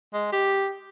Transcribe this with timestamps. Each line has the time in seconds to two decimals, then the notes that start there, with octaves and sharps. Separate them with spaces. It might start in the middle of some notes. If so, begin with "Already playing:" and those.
0.14 G#3
0.32 G4